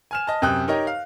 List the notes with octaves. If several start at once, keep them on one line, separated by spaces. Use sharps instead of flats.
G#5 F6 E7
D#5 A5
F#2 C3 G5 D#6 F#6
D#4 G4 A#4 C#5 D#5
F5